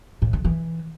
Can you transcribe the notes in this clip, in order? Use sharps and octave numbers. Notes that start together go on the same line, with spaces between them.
A2
D3
E3